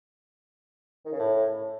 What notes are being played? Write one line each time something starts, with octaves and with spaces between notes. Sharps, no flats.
D#3
C#3
A2